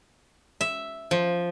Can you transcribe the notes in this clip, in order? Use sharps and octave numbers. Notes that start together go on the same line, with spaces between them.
E5
F3